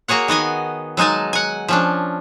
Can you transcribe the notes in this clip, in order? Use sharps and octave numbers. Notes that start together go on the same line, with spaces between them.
A#3 F#4 G#4 C#5 F#5
D#3 B3 D#5 G#5
F#3 G#3 D#4 G#5 A5
F#5 G#5
F3 C#4 D4